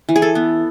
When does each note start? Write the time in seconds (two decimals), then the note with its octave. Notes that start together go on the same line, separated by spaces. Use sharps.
0.09 E3
0.16 G#4
0.22 A4
0.35 B3